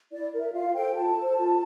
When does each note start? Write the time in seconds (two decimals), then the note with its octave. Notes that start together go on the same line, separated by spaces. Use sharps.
0.12 E4 D5
0.33 A#4
0.39 E5
0.53 F4 F5
0.74 A4 C5 G5
0.95 F4 A5
1.16 A4 C5
1.37 F4